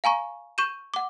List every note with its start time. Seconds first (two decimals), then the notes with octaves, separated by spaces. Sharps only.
0.04 F5 G#5 A#5 C#6
0.58 C#6 G6 D#7 E7
0.94 F#5 D6